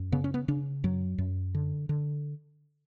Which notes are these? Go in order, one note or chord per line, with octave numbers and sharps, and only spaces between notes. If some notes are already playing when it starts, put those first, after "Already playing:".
Already playing: F#2
C#3 B3
C#4
B3
C#3 D4
F#2 F#3
F#2
D3
D3